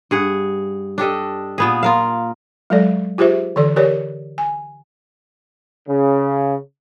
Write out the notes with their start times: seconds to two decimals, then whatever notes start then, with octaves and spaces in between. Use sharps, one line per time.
0.11 G2 G#4 F#5
0.98 D4 G4 A4 D#5
1.58 A#2 B3 G#4
1.83 F4 A#4 F5
2.70 F#3 G#3 A4 D5
3.18 F4 G4 G#4 C5 E5
3.56 D3 E3 A4 D5
3.76 G4 A#4 C#5 D5
4.38 G#5
5.88 C#3